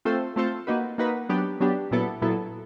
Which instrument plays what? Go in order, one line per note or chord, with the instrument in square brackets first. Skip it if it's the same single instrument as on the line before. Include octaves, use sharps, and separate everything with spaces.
[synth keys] A3 C4 F4 A4 C5
A3 C4 F4 A4 C5
A#3 D#4 F#4 B4
A#3 D#4 F#4 B4
F#3 B3 D4 G4
F#3 B3 D4 G4
A#2 F#3 B3 E4 A4
A#2 F#3 B3 E4 A4